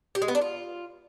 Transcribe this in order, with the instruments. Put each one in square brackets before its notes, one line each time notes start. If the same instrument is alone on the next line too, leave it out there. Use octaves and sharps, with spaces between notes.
[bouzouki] G4
G#3
B3
D4
F4